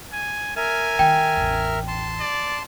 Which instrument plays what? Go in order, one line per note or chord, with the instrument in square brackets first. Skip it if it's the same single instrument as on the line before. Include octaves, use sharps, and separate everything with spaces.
[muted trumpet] G#5
[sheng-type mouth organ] A#4 E5 F6 [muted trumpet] G#5
[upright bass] D#3 [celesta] G5
[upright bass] A1 E2
[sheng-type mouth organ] A5 C6
[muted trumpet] D5